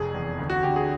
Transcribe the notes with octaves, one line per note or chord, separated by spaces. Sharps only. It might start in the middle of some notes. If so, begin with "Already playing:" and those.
Already playing: F1 F2 G#4
E2
D2
F#4
D3 G4
G#4